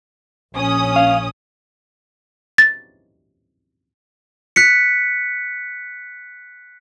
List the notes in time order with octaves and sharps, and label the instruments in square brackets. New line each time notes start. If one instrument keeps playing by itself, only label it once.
[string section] A#1 C#4 D#6
[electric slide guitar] F5
[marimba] A6
[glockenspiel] F#6 B6 C#7